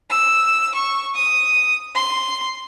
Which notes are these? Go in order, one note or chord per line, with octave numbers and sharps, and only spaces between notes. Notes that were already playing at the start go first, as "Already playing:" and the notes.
E6
C#6
D#6
C6